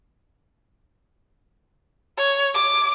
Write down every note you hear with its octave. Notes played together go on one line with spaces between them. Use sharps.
C#5
D6